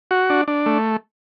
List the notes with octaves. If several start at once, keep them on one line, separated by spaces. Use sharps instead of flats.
F#4
D4
D4
A3